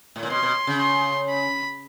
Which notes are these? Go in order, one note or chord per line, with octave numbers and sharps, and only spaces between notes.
A2
A#2
B2 C6
B2
C#3
C6
B5